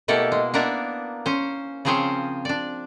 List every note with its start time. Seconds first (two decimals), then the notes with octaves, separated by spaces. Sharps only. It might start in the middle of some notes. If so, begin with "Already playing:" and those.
0.08 B2 A3 A#3 E4 G4 A4
0.32 G#3
0.54 A#3 B3 D4 A#4 E5
1.26 C#4 C5
1.85 C#3 F3 C4 G#4 C5 C#5
2.45 D4 D5